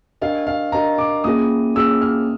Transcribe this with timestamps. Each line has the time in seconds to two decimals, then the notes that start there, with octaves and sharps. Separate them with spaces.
0.22 D4 G4 A#4 D#5 F5
0.47 F5
0.72 D4 G4 A#4 D#5 A#5
0.98 D6
1.24 A#3 C#4 F4 G#4 D#6
1.75 A#3 C#4 F4 G#4 E6
2.02 F6